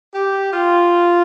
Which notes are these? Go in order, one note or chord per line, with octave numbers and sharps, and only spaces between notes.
G4
F4